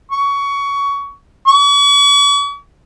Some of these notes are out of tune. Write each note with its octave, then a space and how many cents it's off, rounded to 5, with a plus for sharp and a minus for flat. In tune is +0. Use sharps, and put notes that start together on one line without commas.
C#6 +20
C#6 +45